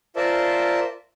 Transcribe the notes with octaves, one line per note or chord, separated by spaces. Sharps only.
F4 A#4 C5 D5 E5 A5